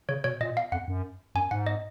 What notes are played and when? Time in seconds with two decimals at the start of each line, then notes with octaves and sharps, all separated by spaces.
0.09 C#3 C#5
0.24 B2 C#5
0.40 A#2 D#5
0.57 F5
0.72 F2 F#5
0.88 F#2
1.35 F#2 G#5
1.51 G#2 F#5
1.67 D#5